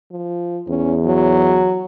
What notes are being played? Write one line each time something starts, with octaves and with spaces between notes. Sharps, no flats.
F3
E2 C#4
F#3